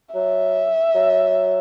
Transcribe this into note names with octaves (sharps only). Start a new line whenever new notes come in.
F#3 E5
F#3